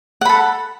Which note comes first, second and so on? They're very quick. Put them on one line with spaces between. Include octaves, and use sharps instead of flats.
F#5 B5 A4